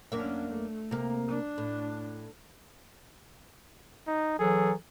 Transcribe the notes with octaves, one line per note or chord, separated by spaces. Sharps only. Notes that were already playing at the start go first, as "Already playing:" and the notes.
F#2 A#3 C#4 D4 E5
A3
C3 A#3
D4
A2
D#4
E3 F#3 G#4 A4